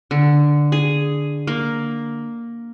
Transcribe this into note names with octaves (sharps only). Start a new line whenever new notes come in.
D3
G#4
A#3